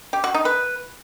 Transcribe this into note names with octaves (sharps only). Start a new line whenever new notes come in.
G4
F#4
D#4
B4